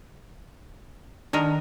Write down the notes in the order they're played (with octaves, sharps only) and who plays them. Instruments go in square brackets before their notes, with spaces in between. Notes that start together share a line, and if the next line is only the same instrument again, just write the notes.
[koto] D#3 A#4 [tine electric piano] D4